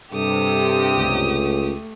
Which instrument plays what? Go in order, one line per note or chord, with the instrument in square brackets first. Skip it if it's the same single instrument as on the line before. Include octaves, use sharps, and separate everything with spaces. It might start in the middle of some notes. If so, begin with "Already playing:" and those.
[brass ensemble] G2 C3 [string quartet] G4 D#6 [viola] A4
[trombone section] C#2 [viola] A3